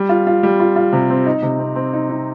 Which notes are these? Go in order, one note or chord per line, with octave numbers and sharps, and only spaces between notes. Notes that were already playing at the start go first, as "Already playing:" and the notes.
Already playing: G3
F4
F4
G3
F4
F4
C3
C4
D#4
C3
C4
C4
D#4
D#4